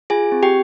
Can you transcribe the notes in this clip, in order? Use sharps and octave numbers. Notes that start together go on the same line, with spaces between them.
F4 G#4 G#5
C4
G4 G5